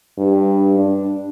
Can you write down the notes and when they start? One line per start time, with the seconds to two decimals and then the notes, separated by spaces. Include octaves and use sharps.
0.18 G2
0.78 D4